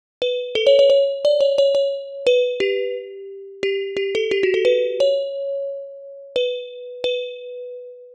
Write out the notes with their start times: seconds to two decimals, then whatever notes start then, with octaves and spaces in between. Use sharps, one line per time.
0.22 B4
0.55 A4
0.67 C#5
0.79 C#5
0.90 C#5
1.25 D5
1.41 C#5
1.58 C#5
1.75 C#5
2.27 B4
2.60 G4
3.63 G4
3.97 G4
4.15 A4
4.31 G4
4.43 F#4
4.54 A4
4.65 B4
5.00 C#5
6.36 B4
7.04 B4